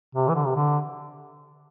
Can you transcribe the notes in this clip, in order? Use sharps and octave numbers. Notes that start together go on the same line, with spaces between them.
C3
E3
D3
C3
D3